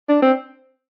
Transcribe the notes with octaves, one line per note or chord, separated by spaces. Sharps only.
D4
C4